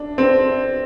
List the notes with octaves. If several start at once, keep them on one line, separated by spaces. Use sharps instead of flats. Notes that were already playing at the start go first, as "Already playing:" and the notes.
Already playing: D4
C4